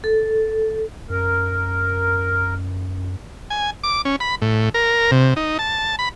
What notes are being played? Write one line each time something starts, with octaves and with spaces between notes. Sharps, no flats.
A4
F#2 A#4
G#5
D6
C#4
B5
A2
A#4
C3
D#4
A5
B5